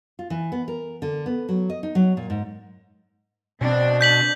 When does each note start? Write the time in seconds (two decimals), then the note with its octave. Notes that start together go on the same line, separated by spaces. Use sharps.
0.19 F4
0.30 E3
0.52 B3
0.68 A#4
1.02 D3
1.26 B3
1.49 F#3
1.70 D#5
1.83 D#4
1.95 F#3
2.17 A#2
2.30 G#2
3.61 B2 C4 D4
4.01 G6 B6 F#7